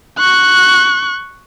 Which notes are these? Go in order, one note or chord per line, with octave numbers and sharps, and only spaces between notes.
C#6 F#6